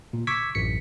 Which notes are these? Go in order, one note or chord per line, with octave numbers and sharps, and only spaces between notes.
A#2
C#6 D6 E6 G#6 B6
A1 F#2 B6 C#7